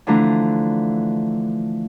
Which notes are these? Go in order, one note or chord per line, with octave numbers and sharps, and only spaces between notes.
D3 E3 F3 A3 D4 A#5